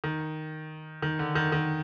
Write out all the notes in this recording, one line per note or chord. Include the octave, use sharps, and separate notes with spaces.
D#3
D#3
D3
D#3
D#3